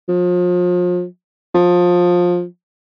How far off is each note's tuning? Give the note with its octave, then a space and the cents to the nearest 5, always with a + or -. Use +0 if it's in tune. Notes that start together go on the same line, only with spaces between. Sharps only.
F3 +35
F3 +20